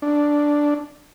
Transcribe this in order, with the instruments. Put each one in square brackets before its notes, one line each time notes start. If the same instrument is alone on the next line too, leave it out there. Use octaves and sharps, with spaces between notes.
[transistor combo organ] D4